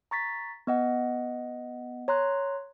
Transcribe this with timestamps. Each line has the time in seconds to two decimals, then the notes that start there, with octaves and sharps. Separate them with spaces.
0.11 A#5 C#6 A6 B6
0.67 B3 D#5 F#5
2.08 C#5 A#5 C6 F#6